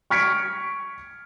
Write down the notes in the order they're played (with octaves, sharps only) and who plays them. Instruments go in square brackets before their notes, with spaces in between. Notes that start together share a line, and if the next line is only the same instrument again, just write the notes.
[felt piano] C#6 F6 G#6 B6 C#7 D7